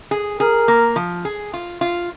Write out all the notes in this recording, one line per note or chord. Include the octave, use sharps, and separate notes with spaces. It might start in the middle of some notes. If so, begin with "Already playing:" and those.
G#4
G#4 A#4
A#3
F3
G#4
F4
F4